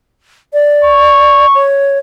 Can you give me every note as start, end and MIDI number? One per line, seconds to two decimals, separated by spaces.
0.53 1.46 74
0.85 1.66 85
1.55 1.99 73